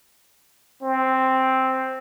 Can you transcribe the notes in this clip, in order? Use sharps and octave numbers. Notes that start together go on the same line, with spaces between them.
C4